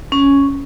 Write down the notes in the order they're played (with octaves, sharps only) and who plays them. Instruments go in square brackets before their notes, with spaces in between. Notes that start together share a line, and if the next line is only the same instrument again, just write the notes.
[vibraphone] C#4